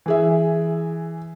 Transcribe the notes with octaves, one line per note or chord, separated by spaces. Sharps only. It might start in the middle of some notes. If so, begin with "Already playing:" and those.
E3 G#4 E5